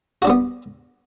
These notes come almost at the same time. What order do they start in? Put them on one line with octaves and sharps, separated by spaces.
F#4 D4 G3 B3